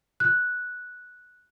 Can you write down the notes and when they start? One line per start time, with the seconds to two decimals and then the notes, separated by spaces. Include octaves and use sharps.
0.20 F#6